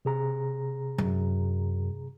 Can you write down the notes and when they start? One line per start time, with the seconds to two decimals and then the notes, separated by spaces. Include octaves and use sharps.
0.05 C3 G#4 A#5
0.98 F#2